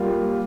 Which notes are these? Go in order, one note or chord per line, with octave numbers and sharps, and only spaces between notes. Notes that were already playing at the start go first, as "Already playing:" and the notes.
Already playing: G3 A#3 F4